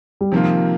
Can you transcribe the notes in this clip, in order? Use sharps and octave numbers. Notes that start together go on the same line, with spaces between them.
G3
C3 D#3 F3 A#3 F4